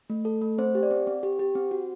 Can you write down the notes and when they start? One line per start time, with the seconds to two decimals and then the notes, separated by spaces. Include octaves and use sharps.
0.10 A3
0.25 A4
0.42 A3
0.58 C4 C5
0.75 G4
0.83 D5
0.91 C4
1.07 C4
1.23 G4
1.39 G4
1.55 C4
1.71 F#4